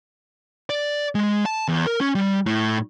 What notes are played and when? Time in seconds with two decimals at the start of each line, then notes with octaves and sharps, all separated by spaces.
0.70 D5
1.15 G#3
1.46 A5
1.68 E2
1.87 A#4
2.01 C#4
2.15 G3
2.46 A2